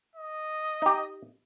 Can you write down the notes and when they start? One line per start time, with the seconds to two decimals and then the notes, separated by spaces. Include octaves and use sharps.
0.15 D#5
0.82 D#4 G4